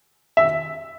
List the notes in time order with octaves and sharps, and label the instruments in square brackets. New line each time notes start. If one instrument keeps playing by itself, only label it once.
[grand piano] E5